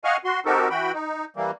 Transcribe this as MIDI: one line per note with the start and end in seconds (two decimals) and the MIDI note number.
0.04 0.17 75
0.04 0.17 77
0.04 0.17 78
0.04 0.17 80
0.04 0.17 85
0.04 0.17 89
0.25 0.40 66
0.25 0.40 84
0.46 0.69 60
0.46 0.69 63
0.46 0.69 66
0.46 0.69 67
0.46 0.69 69
0.46 0.69 70
0.70 0.92 52
0.70 0.92 66
0.70 0.92 79
0.70 0.92 83
0.94 1.25 63
1.36 1.51 52
1.36 1.51 55
1.36 1.51 58